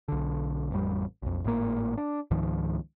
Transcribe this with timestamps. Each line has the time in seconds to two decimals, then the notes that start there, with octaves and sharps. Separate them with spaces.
0.08 B1 D3
0.71 A1 F2 G3
1.22 B1 F2
1.44 G#1 A2 C3 A#3
1.97 D4
2.31 C#2 G#2 D#3 F3